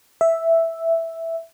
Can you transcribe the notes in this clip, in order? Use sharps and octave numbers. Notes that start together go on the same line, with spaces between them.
E5